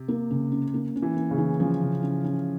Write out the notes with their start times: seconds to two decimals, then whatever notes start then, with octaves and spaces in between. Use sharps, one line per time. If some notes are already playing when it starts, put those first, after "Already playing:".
Already playing: C3
0.08 A#3
0.31 C#3
0.52 C#4
0.74 A#3
0.96 C#4
1.02 E3
1.17 A#3
1.31 C#3
1.38 E3
1.60 F3 C#4
1.81 C#3
2.03 C#4
2.24 C#4